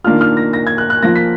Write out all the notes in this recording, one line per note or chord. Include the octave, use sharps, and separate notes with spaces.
D#3 A#3 D4 F4 F6
F6
A#6
A#6
G#6
F#6
F#6
F3 A#3 F4 A#6
B6